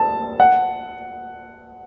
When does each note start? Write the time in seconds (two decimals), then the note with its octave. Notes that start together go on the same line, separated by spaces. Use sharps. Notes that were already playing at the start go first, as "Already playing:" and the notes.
Already playing: A5
0.40 F#5